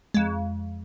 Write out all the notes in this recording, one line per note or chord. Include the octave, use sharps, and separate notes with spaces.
F2 G#3